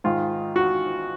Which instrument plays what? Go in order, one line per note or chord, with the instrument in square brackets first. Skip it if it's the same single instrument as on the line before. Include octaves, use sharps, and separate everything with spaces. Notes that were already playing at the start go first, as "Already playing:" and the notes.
[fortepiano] G#2 D#3 F4
F#4